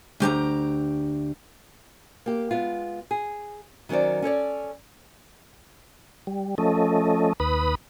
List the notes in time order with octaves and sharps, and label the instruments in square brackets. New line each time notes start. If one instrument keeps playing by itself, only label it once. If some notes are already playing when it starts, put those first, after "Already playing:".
[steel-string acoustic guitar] D2 G4 A5 A#5
[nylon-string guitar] A#3 G4
G#3 B3 F4
G#4
D#3 F#3 C#4 C5 D5
C#4 A4 C#5 D5
[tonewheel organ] G3
F3 A3 C#4 A4 D#5
D#2 B4 B5 D#6